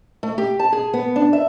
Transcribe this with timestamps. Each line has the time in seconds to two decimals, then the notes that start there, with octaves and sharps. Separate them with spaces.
0.23 A3
0.38 G4
0.59 A5
0.73 G#4
0.93 B3
1.16 D4
1.33 E5